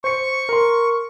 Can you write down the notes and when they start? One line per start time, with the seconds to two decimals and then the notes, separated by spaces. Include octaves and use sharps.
0.04 C5 C#6 C#7
0.49 A#4 C6